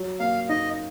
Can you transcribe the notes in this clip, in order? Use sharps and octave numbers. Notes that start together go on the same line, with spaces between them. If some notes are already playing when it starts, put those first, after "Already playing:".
Already playing: F#3
A#3 F5
D#4 D#5